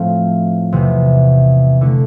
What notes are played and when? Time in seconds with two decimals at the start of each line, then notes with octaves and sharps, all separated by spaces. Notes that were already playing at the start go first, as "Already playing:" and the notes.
Already playing: A2 F3 A3 C4
0.72 E2 C3 E3 B3
1.81 D3 A3 E4